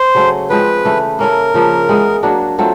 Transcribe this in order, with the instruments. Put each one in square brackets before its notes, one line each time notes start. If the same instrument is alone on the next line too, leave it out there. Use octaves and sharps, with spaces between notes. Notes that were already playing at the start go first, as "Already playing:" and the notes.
Already playing: [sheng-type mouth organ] C5
[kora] C#3 F#3 A3 C#4
[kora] F3 G#3 C4 [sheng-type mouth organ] B4
[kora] C#3 E3 A3
[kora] A#3 C#4 E4 A4 [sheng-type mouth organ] A#4
[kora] C#3 F3 A#3
E3 G#3 B3
F#3 A#3 D4 F#4
F#3 A3 C4 F4